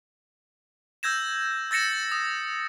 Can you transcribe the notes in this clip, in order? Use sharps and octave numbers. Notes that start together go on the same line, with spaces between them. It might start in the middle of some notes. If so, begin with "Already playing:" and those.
E6 G6 G#6 A#6 E7
E6 A6 A#6 C#7 E7
D#6